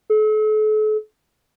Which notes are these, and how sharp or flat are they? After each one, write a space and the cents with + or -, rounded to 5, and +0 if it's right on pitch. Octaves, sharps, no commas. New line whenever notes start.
A4 -40